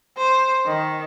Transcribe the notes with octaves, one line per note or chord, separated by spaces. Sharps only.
C5
D#3